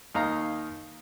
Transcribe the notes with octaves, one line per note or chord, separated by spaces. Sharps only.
D#2 D#4 F5 A#5